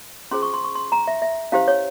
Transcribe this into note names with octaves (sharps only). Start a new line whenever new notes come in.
C#4 F4 G#4 C5 C6
C#6
C6
C#6
C6
A#5
E5
E5
C#4 E4 G4 C5 F5
C#5